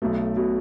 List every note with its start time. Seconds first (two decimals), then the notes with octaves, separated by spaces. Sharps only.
0.02 B1 B2 A3
0.37 B2